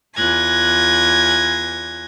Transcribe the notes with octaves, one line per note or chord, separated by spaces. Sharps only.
E2 F4 G#5 F#6 G#6 A#6